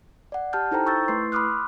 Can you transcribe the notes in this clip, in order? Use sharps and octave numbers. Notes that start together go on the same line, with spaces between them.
D5 F#5
G4 A5 F6 G6
D#4 E4 A4 C5 G5 A#5
C#6 E6 G6 A6
A3 E4 B4 C6 C7
B5 C6 D6 D#6 F6 F#6